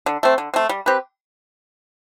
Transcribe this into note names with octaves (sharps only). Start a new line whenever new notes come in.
D3
A3 C4
D3
A3 C4
G3
C4 G4 B4